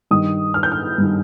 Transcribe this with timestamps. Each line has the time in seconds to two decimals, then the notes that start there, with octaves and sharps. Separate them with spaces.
0.11 G2 D#3 D#6
0.54 F6
0.63 G6
0.72 F6
0.98 G2 D#3